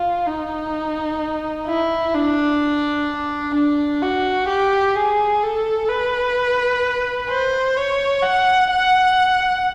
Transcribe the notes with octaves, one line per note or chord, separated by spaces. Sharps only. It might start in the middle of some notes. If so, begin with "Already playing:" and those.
Already playing: F4
D#4
E4
D4
D4
F#4
G4
G#4
A4
B4
C5
C#5
F#5
F#5